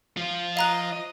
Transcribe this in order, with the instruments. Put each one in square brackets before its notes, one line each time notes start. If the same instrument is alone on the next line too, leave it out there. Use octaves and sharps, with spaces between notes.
[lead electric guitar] F3 F4
[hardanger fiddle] D#5 [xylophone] F5 A#5 F#6